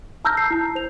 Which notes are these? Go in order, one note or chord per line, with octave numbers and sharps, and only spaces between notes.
A5 A#5 E6 F6 G6 A#6
C7
E4 A5
C5 F7